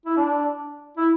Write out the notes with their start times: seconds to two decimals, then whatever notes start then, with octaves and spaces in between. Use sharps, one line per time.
0.06 E4
0.17 D4
0.97 E4